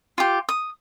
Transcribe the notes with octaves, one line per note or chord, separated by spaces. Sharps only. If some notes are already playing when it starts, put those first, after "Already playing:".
F4 G4
D#6